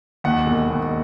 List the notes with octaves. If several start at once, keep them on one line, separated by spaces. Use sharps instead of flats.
D#2 F#5
E1
D#2